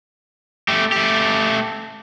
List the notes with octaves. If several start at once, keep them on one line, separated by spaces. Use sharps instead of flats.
A3 G4
A3 G4